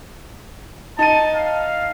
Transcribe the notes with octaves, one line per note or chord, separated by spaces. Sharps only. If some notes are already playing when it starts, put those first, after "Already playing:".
D#4 A5 D#7
F5